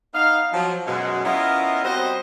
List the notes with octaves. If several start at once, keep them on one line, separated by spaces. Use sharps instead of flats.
B3 D#4 D#5 F5
F3 F#3
F#2 B2 G#3
B3 C#4 E4 F4 A#4 D#5
G3 C4 F#4 C5 D#5